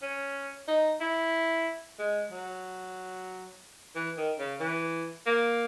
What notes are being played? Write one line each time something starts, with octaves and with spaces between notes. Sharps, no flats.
C#4
D#4
E4
G#3
F#3
E3
D#3
C#3
E3
A#3